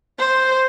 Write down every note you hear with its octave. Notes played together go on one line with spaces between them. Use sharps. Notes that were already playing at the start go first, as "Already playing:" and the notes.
C5